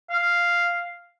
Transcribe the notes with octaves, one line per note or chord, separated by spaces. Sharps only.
F5